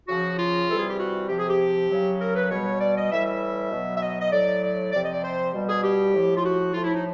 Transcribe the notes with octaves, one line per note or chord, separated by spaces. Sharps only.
C#3 F3 F#4
F4
C3 E3 G3 A4
G#4
G4
F#4
C3 F3 G4
G#4
G4
C#3 F#3
A#4
B4
B2 G3 C#5
D5
D#5
A2 E3 G3 E5
E5
B2 F#3
E5
D#5
D#5
A2 F#3 D5
D5
C3 F3 D5
D#5
D5
C5
B2 G3
G#4
G4
A2 F3
F4
F#4
A2 F3 F4
E4
D#4